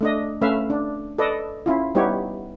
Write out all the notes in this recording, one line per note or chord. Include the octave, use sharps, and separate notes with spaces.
A3 D4 D#5
A3 C#4 B4 E5 F5
D4
A4 B4 D5 D#5
C#4 E4 F4
G3 B3 D#4 E4 G4 C#5